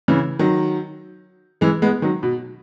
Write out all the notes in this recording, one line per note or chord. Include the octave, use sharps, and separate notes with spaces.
C#3 E3
D#3 F#3
E3 G#3
G#3 B3
D#3 F#3
B2